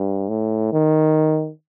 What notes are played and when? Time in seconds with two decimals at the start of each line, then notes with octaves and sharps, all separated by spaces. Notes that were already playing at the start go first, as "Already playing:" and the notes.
Already playing: G2
0.29 A2
0.72 D#3